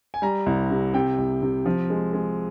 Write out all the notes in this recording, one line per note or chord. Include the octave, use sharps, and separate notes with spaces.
G#5
G3 A#5
C2
C3
C3 G5
C2
C3
F3
G#3
G#3